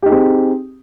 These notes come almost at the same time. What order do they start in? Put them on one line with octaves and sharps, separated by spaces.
G4 D#4 G#4 C4